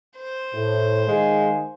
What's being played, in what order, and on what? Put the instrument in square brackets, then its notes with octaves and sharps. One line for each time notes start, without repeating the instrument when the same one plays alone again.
[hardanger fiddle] C5
[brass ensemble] A2
[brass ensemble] D#3 F5 G#5 [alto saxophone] G#3